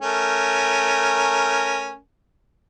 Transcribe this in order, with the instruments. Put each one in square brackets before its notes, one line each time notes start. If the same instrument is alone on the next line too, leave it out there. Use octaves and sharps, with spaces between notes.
[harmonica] A3 C#4 A#4